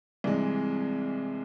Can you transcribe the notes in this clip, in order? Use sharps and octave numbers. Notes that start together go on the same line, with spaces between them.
C2 C3 E3 G#3